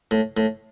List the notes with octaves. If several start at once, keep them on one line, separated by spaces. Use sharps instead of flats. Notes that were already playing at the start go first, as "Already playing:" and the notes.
A2
A2